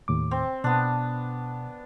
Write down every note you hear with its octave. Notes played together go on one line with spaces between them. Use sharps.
D#2 A2 D6
C4
B2 B3 D4